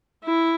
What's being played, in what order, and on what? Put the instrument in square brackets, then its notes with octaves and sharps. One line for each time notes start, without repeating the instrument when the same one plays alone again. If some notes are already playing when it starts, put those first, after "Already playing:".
[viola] E4